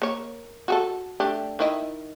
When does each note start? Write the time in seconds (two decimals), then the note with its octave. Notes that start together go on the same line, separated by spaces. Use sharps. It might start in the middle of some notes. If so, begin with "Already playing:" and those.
0.02 A#3 C#5
0.68 F#4 G#4 A4
1.20 A3 D4 G4
1.59 D#3 E4 D#5